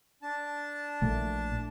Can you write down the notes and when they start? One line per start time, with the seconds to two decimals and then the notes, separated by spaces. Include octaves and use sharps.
0.22 D4 A5
1.02 A#1 A3